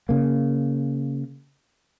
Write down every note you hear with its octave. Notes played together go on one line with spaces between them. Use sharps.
C#3 A#3